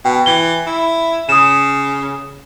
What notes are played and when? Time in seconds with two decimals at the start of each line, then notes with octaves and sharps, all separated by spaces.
0.05 B2 G5
0.26 E3 G7
0.67 E4
1.29 C#3 D#6 E7